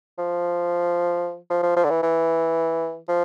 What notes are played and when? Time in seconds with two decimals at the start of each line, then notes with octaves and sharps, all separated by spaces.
0.18 F3
1.50 F3
1.63 F3
1.76 F3
1.85 D3
1.90 E3
2.03 E3
3.08 F3